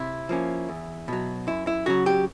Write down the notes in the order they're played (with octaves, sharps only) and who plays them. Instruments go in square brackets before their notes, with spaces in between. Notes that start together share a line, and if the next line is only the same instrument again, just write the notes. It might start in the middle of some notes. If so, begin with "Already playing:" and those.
Already playing: [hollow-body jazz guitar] C3 E4
F3 A#3 C#4
E2
B2 F#3
F#2 E4
E4
C#3 F#3 F#4
G4